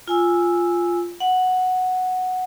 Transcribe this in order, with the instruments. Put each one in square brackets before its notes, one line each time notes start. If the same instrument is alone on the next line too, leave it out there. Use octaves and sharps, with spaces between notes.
[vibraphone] F4 G#5 E6
F#5